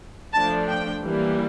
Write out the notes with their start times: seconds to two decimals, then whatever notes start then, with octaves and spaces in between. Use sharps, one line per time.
0.34 F3 A3 D4 A5
0.68 G5
1.03 E3 G3 A#3